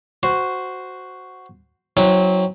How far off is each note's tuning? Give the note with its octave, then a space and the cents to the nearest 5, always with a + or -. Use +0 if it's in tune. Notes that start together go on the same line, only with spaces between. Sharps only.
F#4 +0 C5 -10
F#3 +0 C4 +10 E4 -35